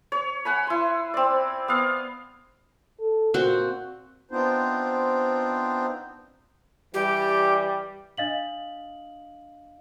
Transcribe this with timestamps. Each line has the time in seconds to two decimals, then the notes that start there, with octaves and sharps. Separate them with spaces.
0.12 C#5
0.45 F#5 G#5 B5
0.67 E4 C6
1.14 C4 D5
1.68 B3 F5
2.99 A4
3.34 A#2 C4 F#4
4.31 B3 C4 D4 D#4 F4 C5
6.94 E3 G3 G4
8.18 D4 D#5 F5 F#7